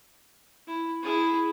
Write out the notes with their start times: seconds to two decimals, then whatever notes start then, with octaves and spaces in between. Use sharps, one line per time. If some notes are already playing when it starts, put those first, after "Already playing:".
0.67 E4
1.03 E4 G#4